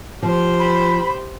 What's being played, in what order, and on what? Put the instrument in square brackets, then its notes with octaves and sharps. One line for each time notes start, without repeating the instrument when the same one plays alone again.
[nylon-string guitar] F3 [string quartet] G4 C5
[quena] B5